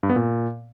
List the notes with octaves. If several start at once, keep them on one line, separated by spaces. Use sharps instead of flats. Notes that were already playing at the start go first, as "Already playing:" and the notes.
G2
B3
A#2